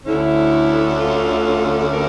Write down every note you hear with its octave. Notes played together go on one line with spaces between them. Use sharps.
D2 D3 A3 C#4 E4
F4
A#4